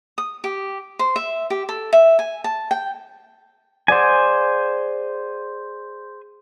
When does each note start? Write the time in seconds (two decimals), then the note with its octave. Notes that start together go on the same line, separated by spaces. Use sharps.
0.18 D#6
0.44 G4
0.99 C5
1.16 E5
1.50 G4
1.69 A4
1.93 E5
2.19 G#5
2.44 A5
2.71 G5
3.88 G#4 C5 D5 F#5 G#5